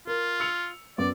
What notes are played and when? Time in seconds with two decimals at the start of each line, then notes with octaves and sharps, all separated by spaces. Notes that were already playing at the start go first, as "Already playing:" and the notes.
0.07 F4 A#4
0.40 E6 C#7 F7
0.98 F#2 B3 D5 D6